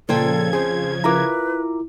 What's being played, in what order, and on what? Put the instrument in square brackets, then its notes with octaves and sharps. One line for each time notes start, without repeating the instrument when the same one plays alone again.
[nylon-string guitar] A#2 C5 G5 [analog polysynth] C#3 F3 G#6 [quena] A4
[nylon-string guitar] F2 [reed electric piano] G#4 [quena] C5
[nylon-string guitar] E4 F4 A#4 [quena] B4 [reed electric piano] A#5 D6